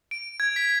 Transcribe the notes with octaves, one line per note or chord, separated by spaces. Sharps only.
D7
G#6
B6